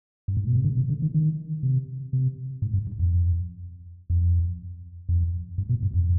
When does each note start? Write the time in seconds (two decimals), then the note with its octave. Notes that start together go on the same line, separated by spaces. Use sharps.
0.28 G2
0.37 G#2
0.47 B2
0.56 C3
0.64 D3
0.77 C3
0.89 D3
1.02 D#3
1.14 D#3
1.63 C3
2.13 C3
2.62 G#2
2.74 G2
2.87 G2
2.99 F2
4.10 F2
5.09 F2
5.58 G2
5.69 B2
5.82 G2
5.94 F2